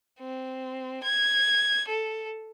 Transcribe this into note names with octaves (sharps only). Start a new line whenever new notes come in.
C4
G#6
A4